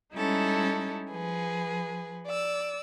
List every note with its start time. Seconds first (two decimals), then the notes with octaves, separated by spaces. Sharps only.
0.14 G3 G#3 C#4 D#4 E4 A4
1.10 F3 G#4 B4
2.26 D5 E6